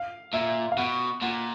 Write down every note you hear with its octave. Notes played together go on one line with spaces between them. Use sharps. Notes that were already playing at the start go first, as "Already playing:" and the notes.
Already playing: F5
A#2 E5
F5
B2 F#5
A#2 F#5